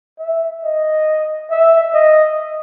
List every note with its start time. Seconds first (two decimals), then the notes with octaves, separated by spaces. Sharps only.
0.20 E5
0.64 D#5
1.51 E5
1.94 D#5